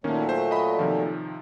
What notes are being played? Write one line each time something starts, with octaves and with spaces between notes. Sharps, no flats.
A#2 D#3 F#3 A3 A#3 C#4
C5
D#5 B5
C3 D#3 F3